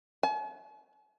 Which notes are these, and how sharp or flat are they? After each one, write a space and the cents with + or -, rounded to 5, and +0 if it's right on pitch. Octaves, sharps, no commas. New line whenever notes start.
G#5 +45